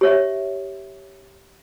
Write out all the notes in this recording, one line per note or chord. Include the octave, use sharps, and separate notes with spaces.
G4 C#5 E5